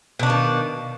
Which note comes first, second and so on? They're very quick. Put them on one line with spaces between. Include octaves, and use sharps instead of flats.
B2 D4 A#3 D#3